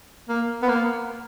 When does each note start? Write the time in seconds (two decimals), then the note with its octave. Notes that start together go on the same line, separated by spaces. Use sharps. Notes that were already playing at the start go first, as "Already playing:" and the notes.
0.29 A#3
0.62 B3
0.69 A#3